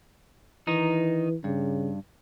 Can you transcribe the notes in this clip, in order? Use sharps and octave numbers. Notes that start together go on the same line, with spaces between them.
D#3 E3 D#4
G2 C#3